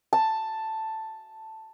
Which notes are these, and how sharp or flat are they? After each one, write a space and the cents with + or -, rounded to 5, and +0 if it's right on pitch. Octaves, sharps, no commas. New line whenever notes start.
A5 +5